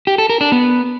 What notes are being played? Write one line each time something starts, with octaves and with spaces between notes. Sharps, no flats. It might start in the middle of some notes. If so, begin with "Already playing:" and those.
G4
A4
A#4
D4
B3